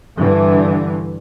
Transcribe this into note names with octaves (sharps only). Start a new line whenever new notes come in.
G2 D3 E3